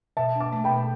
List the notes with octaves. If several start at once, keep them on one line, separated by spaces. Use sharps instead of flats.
B2 E5 A5
D4
A5 D6
A3
G5 B5
B2